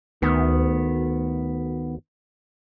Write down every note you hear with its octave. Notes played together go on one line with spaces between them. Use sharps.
D2 D#3 B3